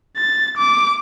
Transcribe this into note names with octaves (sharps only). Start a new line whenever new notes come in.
A6
D6